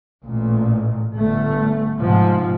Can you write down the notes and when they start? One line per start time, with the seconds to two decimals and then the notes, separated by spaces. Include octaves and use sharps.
0.23 A1 A#2
1.16 G1 A3
1.98 G#2 C3 F3